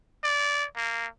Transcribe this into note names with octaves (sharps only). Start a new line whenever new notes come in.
D5
A#3